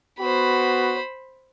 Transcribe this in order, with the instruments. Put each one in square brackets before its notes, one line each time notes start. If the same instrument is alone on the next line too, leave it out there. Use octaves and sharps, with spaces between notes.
[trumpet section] B3 F#4 [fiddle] C5 B5